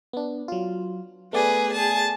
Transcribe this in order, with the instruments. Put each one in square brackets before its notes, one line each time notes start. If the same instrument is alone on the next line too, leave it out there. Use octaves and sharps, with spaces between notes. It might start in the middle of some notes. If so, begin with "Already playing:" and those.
[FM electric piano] B3 D4
F#3 F4
[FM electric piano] A3 B3 D5 [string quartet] G#4 B4
[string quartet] G#4 A5